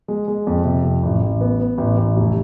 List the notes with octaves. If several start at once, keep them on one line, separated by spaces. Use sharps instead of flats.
G#3
G#3
F2
C3
F2
A1
A1
B3
B3
A1
A1
F1